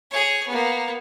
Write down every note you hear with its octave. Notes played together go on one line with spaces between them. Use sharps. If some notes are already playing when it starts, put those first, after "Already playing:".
G#4 C#5
A#3 B3